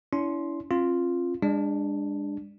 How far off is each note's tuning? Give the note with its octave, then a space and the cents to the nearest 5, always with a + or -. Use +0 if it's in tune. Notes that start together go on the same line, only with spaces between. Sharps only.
C#4 +45 E4 +0 C6 +0
C4 +45 F4 +0
G#3 -35 D4 +0